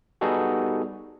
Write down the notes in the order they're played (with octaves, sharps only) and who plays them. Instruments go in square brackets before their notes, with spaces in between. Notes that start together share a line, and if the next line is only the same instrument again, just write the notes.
[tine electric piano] G3 B3 D#4 F#4 G#4 A4